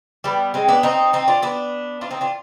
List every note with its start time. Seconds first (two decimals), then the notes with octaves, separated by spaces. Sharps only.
0.24 G3 B3
0.54 G#3 C4
0.69 B3 D4
0.83 C4 D#4
1.13 C4 D#4
1.28 D4 F4
1.42 B3 D4
2.01 D4 F4
2.11 C4 D#4
2.21 D4 F4